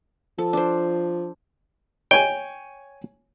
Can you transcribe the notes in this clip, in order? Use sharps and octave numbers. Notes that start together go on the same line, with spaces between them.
F3 A4
D4 C5
C#5 G5 G#5